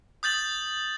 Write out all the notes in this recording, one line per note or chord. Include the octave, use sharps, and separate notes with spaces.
D#6 G6 A6 F#7